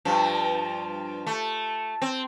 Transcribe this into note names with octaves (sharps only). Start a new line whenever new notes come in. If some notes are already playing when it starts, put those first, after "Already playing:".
G2 F3
A3
C4